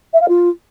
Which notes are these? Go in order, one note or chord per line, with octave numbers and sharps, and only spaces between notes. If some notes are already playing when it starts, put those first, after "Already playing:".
E5
F5
F4